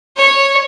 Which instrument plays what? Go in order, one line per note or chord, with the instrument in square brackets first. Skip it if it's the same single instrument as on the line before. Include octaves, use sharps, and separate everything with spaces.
[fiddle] C#5